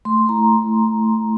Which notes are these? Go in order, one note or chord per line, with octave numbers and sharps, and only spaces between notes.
A3 C6
E4 A#5
A3